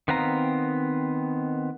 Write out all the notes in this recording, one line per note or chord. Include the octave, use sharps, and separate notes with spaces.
D#3 B3 C4 F5 A#5